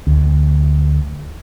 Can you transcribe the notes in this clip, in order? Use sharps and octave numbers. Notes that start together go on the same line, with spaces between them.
D2